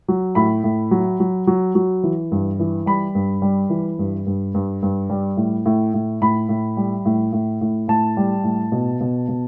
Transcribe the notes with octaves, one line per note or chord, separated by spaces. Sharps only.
F#3
A2 B5
A2
F#3
F#3
F#3
F#3
E3
G2
E3
G3 B5
G2
G3
E3
G2
G2
G2
G2
G3
A2
A2
A2
A2 B5
A2
G3
A2
A2
A2
A2 A5
G3
A2
B2
B2
B2